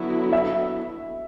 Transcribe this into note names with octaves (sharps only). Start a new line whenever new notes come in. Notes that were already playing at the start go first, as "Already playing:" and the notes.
Already playing: D3 F#3 B3 E4
E5